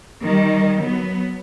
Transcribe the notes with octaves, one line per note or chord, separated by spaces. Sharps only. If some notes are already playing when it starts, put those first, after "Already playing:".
D#3 G3
F#3 B3